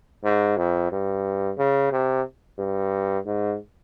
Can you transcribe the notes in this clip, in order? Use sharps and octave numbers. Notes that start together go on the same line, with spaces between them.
G#2
F2
G2
C#3
C3
G2
G#2